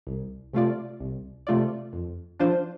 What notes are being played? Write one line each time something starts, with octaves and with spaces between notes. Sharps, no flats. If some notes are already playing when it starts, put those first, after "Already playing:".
C2
C3 A3 F4 D5
C2
C3 A3 F4 D5
F2
F3 D4 F4 C5